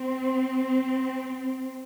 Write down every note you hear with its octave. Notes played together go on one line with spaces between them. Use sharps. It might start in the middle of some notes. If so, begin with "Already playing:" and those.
Already playing: C4